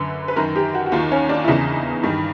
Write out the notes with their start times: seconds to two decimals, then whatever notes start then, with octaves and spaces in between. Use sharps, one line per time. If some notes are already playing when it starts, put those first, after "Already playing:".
Already playing: F#2 D3 B4
0.28 B4
0.36 F#2 D#3 A#4
0.56 G4
0.74 F#4
0.86 F#4
0.92 D#2 D#3 F4
1.11 C#4
1.29 D4
1.44 E4
1.48 E2 C#3 E3 D#4
2.03 G2 D#3